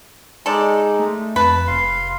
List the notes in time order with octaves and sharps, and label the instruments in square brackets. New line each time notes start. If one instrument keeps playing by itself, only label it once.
[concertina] G#3 D#4 [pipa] A4 D5
[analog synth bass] A3
[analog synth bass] F2 [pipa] B4 [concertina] A5
[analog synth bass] F1 [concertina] F5 C6